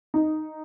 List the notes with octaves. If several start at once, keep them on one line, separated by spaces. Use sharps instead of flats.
D#4